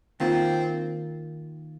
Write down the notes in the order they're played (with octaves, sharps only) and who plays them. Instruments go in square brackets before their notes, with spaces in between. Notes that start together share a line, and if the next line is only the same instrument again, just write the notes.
[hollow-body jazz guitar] D#3 A#3 F4 [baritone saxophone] C4